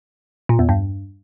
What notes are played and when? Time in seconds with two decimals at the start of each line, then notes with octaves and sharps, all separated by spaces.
0.49 A#2
0.59 E2
0.69 G2